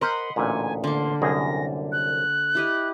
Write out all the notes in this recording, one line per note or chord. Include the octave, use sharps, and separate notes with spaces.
A#4 C5 D#5 F#5 B5 C6
A1 D2 A#2 G#5
D3 A#3 C6
C2 F#2 G#4 A#6
F#6
E4 G4 D#5